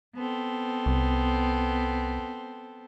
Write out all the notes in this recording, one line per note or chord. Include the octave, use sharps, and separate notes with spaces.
B3 C4 A4
C2